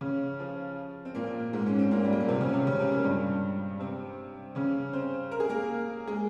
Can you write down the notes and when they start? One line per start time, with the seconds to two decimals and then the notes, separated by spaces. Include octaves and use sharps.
0.01 C#3 C#4
0.39 F3 F4
1.05 C4
1.15 A#2 A#3
1.53 G#2 G#3
1.66 C#4
1.79 C4
1.91 A#2 A#3
2.05 G3
2.12 G#3
2.20 A#3
2.28 C3 C4
2.41 C#3 C#4
2.53 C3 C4
2.67 C#3 C#4
2.79 C3 C4
2.92 A#2 A#3
3.04 G2 G3
3.80 C3 C4
4.55 C#3 C#4
4.93 C4 C5
5.31 A#4
5.40 G#4
5.49 A#3 A#4
6.07 G#3 G#4